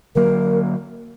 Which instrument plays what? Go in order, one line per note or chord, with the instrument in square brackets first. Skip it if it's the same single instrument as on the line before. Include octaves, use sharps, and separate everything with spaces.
[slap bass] D3 F#3 A#3 [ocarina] A#4